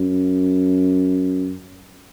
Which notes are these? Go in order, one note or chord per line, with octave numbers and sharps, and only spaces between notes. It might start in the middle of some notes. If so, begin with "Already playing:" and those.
Already playing: F#2